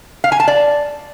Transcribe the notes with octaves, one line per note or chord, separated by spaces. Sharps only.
F5
G#5
A5
D5